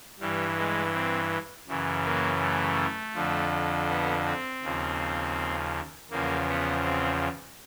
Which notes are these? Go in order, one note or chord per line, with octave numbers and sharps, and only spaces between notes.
G2 E3 G3
G#3
C4
F#2 C#3 E3
A#3
A3
F2 D3 F3
B3
C4
D#2 C#3 F3
E2 C#3 F3 A#3
B3
C4